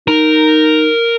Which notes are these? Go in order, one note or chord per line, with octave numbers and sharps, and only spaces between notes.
D#4 A#4